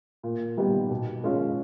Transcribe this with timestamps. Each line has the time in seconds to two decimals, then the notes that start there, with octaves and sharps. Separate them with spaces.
0.23 A#2
0.57 G3 B3 D#4 G4
0.90 B2
1.24 G#3 C#4 F4